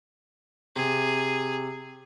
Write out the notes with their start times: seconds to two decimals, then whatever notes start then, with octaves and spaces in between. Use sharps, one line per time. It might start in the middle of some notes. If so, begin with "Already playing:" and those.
0.76 C3 G#4